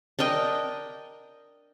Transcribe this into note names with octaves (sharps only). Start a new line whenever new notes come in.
D4 A#4 D#5 G5